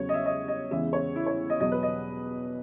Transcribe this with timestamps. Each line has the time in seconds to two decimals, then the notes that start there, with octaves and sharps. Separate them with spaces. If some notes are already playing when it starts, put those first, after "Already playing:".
Already playing: E2 C#3 F#3 C#5
0.09 D#5
0.14 E5
0.26 D#5
0.48 D#5
0.71 E2 C#3 E3 G#3 E5
0.93 C#5
1.16 E4
1.26 C#5
1.50 D#5
1.60 E2 B2 F#3 D#5
1.72 B4
1.83 D#5